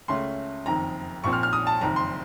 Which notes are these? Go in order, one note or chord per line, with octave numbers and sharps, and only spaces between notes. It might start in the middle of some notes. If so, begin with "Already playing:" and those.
C#2 C#3 A3 C#4 C6
F#1 F2 D#3 A#5
A#1 A#2 F3 C4 C#6
F6
F6
D#6
A5
F#1 F2 D#3 A#5
C6